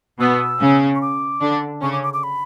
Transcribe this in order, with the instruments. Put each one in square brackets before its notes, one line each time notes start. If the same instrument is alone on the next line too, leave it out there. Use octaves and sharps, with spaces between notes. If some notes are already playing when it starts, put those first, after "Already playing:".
[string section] B2 B3 [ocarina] E6
[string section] C#3 C#4
[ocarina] C#6
D6
[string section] D3 D4
[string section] C#3 C#4 [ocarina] C#6
[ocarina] D6
D6
D6
B5